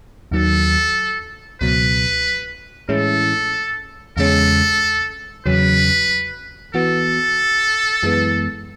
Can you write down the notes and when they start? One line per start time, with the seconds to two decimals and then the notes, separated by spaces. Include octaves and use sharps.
0.31 D#2 D#3 F#3 A4
1.61 C#2 B2 F#3 B4
2.89 A2 E3 G#3 C#4 E4 A4
4.17 E2 C#3 G#3 C#4 A4
5.46 E2 C#3 F#3 C#4 B4
6.74 E3 B3 F#4 A4
8.03 F#2 E3 G#3 B3